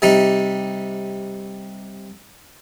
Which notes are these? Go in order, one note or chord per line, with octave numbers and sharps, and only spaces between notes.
C3 G3 D#4